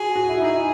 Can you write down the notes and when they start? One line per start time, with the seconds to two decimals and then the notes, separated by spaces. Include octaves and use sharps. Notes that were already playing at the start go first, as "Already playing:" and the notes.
Already playing: F#4 G#4
0.16 F#4
0.29 E4
0.41 D#4 G#4
0.54 E4